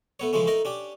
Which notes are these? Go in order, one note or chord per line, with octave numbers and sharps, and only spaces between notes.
A3 B3 C#5
C#3 E3 F3 G#3 A3 C#4
A3 D#4 A#4
C#4 D4 G4